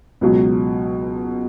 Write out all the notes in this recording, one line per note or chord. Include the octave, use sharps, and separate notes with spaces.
C#2 B2 F#3